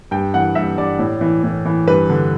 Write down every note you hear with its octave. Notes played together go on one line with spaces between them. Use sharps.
G2 G5
E3 F#5
G2 E5
G2 D5
A2
E3
A2
E3
G2 B4
D3